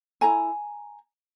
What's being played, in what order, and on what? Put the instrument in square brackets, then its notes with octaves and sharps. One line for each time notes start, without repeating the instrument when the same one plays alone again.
[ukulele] E4 A4 G#5 A#5